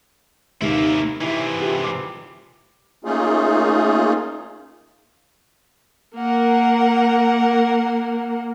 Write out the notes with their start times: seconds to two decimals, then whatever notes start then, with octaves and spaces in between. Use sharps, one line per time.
0.62 D#2 C3 D#3 A#3 E4
1.21 C3 E3 E4 E5
1.62 F4 G4
1.84 D6 C7
3.05 A3 A#3 C#4 D#4 F4 G#4
6.16 A#3 A#4 F#5